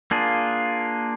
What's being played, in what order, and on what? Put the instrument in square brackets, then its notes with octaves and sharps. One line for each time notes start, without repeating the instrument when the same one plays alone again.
[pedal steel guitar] A#3 D4 F4 G#4